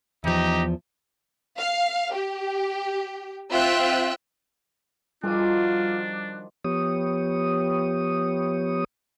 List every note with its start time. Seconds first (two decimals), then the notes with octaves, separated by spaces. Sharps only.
0.24 E2 F3 D#4 G4
1.57 F5
2.14 G4
3.51 C4 F4 E5 G5 E6 F#6
5.24 D#3 F3 G3 D4 F4 F#4 D6
6.65 F3 B3 G4 C#5 D#6